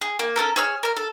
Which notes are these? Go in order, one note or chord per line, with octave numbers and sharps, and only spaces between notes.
G#4
A#3
C#4 F#4 A4 A#4
G#4 C#5 E6 F6
A#4 F6
A4